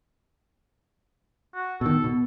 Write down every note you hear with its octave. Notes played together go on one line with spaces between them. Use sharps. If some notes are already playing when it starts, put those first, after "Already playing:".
F#4
B2 D#3 A4
B2